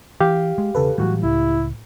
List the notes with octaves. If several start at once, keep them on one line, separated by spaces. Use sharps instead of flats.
E3 G4 F5
G#3
E1 C#3 A4 B4
A2 E3 F#3 G3 F#4
C#2 E4